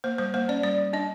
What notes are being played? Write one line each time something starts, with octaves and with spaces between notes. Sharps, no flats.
A#3 C5
G3 C5
A#3 C5
C#4 D5
G3 D5
G3
D4 D#5